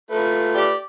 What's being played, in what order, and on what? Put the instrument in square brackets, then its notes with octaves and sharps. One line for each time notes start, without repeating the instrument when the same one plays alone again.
[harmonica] A3 F4 B4
[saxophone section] G4 D5